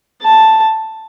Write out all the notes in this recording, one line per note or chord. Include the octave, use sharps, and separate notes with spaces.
A5